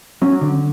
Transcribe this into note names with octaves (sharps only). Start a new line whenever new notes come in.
F#3 C#4
D3